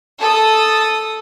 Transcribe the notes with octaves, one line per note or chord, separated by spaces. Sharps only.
A4 D#6